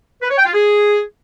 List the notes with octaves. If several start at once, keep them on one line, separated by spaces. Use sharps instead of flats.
B4
C#5
G5
F4
G#4